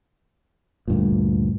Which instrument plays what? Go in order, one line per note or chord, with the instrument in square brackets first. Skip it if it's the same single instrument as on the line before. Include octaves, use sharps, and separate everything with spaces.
[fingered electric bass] D2 G2 A#2